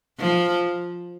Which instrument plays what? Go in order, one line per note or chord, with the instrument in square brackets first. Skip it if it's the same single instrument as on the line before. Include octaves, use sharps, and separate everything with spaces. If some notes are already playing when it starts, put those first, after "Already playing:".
[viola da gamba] F3